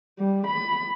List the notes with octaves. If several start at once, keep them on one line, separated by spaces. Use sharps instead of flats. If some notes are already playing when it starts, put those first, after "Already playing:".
G3
B5